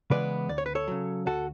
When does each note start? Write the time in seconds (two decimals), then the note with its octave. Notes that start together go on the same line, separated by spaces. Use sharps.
0.10 C#3 E3 G#3 B3 B4 D5
0.49 D2 D5
0.58 C#5
0.66 B4
0.75 A4 C#5
0.88 C#3 F#3
1.26 D2 F#4 A4